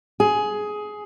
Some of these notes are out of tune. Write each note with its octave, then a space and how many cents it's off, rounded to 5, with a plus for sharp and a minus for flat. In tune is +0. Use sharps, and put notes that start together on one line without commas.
G#4 +15